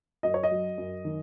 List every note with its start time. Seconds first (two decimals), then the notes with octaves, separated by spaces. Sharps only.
0.23 F#2 D#5
0.34 C#5
0.43 D#5
0.51 F#3
0.78 F#2
1.05 D#3